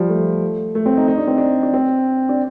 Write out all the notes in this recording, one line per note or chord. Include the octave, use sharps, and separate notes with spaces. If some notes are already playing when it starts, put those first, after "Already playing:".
Already playing: F3 G3
A3
A3
C4
D#4
D#4
D4
C4
D4
D4
C4
D4